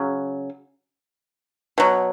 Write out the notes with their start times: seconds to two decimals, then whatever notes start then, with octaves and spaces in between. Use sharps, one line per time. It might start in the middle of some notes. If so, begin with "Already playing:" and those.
Already playing: C#3 F#3
1.78 B2 F#3